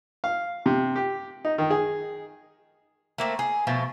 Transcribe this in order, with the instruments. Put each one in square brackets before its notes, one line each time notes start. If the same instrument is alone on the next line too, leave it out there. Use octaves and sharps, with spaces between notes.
[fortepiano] F5
C3
G4
D#4
D#3
G#4
[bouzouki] A3 A#3 C4
G#4
B2 F3 A3